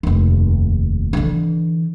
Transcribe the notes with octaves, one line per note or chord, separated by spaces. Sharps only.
F1 D#2
D3 E3